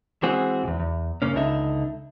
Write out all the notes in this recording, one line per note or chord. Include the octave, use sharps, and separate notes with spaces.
E3 G#3 C4 F#4 G#4
B1 E2
E2
G2 C#3 A#3 C#4
C#2 D3 D#4 E5